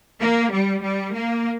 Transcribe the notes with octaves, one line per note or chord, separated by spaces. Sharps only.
A#3
G3
G3
A#3